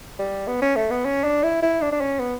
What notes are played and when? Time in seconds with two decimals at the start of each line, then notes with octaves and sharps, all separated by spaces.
0.19 G3
0.47 B3
0.62 C#4
0.76 A3
0.91 B3
1.05 C#4
1.24 D4
1.43 E4
1.62 E4
1.81 D4
1.92 D4
2.01 C#4
2.20 B3